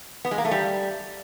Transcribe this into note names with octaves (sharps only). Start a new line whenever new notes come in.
B3
G#3
A#3
A3
G3